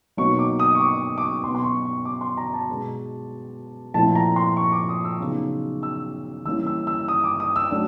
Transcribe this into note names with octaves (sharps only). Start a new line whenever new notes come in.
B2 F#3 A#3 D#4 C#6
D6
D#6
C#6
D6
D6
C#6
B2 F#3 B3 C6
C6
C#6
C#6
D6
C6
A#5
A5
B2 G#3 B3
A#2 F3 A3 C4 E4 A5
A#5
C6
C#6
D6
D#6
E6
C#3 F#3 B3 D#4
E6
E3 G3 A#3 C#4 E4 E6
E6
E6
D#6
D6
D#6
E6
F#3 A3 D4 E6